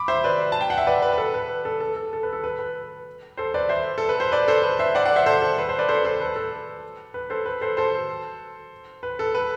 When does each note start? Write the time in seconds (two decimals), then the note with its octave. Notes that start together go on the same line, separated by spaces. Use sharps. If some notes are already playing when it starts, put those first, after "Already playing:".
Already playing: B5 D6
0.08 C5 E5
0.24 B4 D5
0.52 A5
0.61 G5
0.70 F#5
0.78 E5
0.87 B4 D5
1.02 B4
1.13 B4
1.18 A4
1.34 B4
1.65 A4
1.80 A4
1.96 A4
2.13 A4
2.23 B4
2.33 A4
2.44 B4
2.59 B4
3.37 A4 C5
3.54 B4 D5
3.69 C5 E5
3.98 A4
4.09 B4
4.20 C5
4.32 B4 D5
4.48 A4 C5
4.63 B4
4.79 C5 E5
4.95 D5 F#5
5.05 D5 F#5
5.16 C5 E5
5.26 A4 C5
5.42 A4
5.58 B4
5.69 A4 C5
5.79 B4 D5
5.89 A4 C5
6.04 A4 C5
6.21 B4
6.36 A4
7.14 B4
7.30 A4 C5
7.46 B4
7.61 A4 C5
7.77 A4 C5
9.03 B4
9.19 A4
9.35 B4